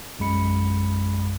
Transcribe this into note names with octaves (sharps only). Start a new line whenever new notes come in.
A#1 F#2 G#3 B5 C#7